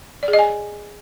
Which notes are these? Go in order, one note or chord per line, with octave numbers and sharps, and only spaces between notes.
D5
G#4
D#5
G#5